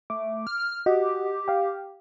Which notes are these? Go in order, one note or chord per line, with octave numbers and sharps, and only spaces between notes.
A3 D6
F6
F#4 G4 D#5 F#5
F5 G5